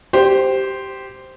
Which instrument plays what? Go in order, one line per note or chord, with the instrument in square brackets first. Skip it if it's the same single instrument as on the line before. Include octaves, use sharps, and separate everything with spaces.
[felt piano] G4 C5